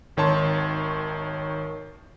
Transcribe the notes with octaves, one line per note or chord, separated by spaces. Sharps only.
G#1 D#3 C#5 A5 C6